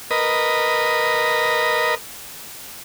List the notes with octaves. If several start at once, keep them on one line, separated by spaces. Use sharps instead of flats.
A#4 B4 D#5